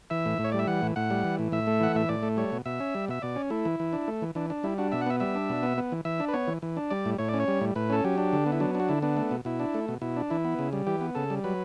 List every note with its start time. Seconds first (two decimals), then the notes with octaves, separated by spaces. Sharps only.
0.10 E3 E5
0.26 A2
0.39 A2
0.44 C#5
0.52 G3 D5
0.59 E5
0.67 E3 F#5
0.82 A2
0.96 A2 F#5
1.10 G3
1.24 E3
1.39 A2
1.52 A2 E5
1.67 A3
1.80 E3 F#5
1.95 A2 E5
2.09 A2 D5
2.23 A3
2.37 G3 C#5
2.52 B2
2.66 B2 E5
2.80 C#4
2.95 G3
3.08 B2 E5
3.22 B2 D5
3.36 C#4
3.50 A3 E4
3.65 E3
3.80 E3
3.93 D4
4.08 A3
4.22 E3
4.35 E3 D4
4.50 D4
4.63 G3 E4
4.78 D4 F#4
4.92 B2 E5
5.01 F#5
5.06 B3 E5
5.20 G3 E5
5.35 D4
5.50 B2
5.63 B3
5.77 B3
5.92 E3
6.05 E3 E5
6.20 D4
6.28 B4
6.33 B3 C#5
6.48 E3
6.62 E3
6.77 D4
6.90 G3 D5
7.05 A2
7.19 A2 C#5
7.29 D5
7.34 C#4
7.40 C#5
7.48 G3
7.61 A2
7.75 A2 B4
7.90 C#4 A4
8.04 F#3 G4
8.18 D4
8.33 D3
8.46 B3
8.52 E4
8.60 F#3 D4
8.75 D4 F#4
8.89 D3 E4
9.02 B3 D4
9.17 A3
9.31 B2
9.45 B2 E4
9.60 D4
9.74 A3
9.88 B2
10.02 B2 E4
10.17 D4
10.30 E3 E4
10.45 B3
10.59 C#3
10.73 G3
10.87 E3 G4
11.01 B3
11.15 C#3 A4
11.30 G3
11.44 F#3 B4